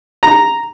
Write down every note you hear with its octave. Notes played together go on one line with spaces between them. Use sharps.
A#5